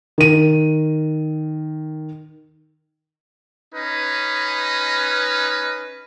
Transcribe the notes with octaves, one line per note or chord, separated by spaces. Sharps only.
D#3 D#7
C#4 D#4 B4